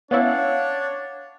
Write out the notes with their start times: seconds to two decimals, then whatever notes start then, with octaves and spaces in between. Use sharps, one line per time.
0.11 B3 C#4 D4 E4 C#5 F5 F#5